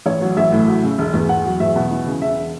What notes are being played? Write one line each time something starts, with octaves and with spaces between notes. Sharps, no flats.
A1 C#5
F#3
A1 E5
A2
F#3
C#3
E1
E2
E2 F#5
F#3
E2 E5
B2
E3
C#3
E1 E5